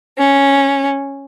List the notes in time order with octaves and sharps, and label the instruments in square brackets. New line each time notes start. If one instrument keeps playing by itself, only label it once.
[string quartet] C#4